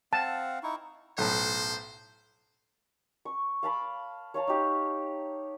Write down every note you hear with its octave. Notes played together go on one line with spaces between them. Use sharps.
C4 F5 F#5 A5
D#4 E4 C#6
B1 A2 C5
C#6
F5 A5 B5 D6
C#5 F5 A5 A#5
D#4 G4